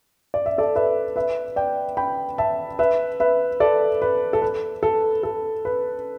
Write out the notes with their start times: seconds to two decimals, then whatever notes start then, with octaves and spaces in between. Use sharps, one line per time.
0.34 D5
0.46 E5
0.58 A4 D5
0.76 B4 E5
1.16 B4 E5
1.56 D5 G5
1.97 G5 B5
2.38 E5 A5
2.79 B4 E5
3.20 B4 E5
3.60 A4 D5
4.02 B4
4.33 A4
4.42 B4
4.83 A4
5.23 A4
5.65 B4